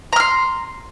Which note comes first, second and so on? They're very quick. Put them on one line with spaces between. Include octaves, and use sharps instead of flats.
A#5 F6 C6